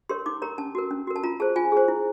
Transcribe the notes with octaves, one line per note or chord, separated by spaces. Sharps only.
G4 A#4 C#5 C6
D#4 D6
G4 A#4 C#5 A#5
C#4 A5
F#4 A#4
C#4
F#4 A#4
A5
F4 A#5
G#4 C5 A5
F4 G#5
G#4 C5
E4